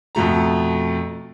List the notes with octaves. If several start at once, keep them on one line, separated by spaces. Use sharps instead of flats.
F2 B2 A3 A#5